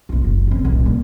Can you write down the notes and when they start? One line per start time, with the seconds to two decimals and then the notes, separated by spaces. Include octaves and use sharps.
0.09 A#1 F4
0.24 F#1
0.47 C#2 C4
0.64 D1 B1
0.86 G3 A#3